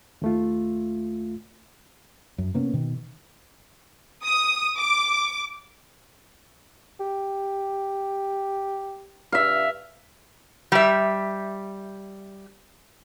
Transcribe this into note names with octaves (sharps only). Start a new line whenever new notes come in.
D#2 A3 F4
F#2
C3 A#3 B3 C#4
B2 D#3
D#6
D6
G4
G2 E5 F5
G3 E5